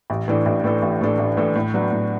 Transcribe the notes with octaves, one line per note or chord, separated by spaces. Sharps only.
A1
A2 E3 D4 A4
A1
A2 E3 D4 A4
A1
A2 E3 D4 A4
A1
A2 E3 D4 A4
A2
F#3 B3 D4 F#4
A2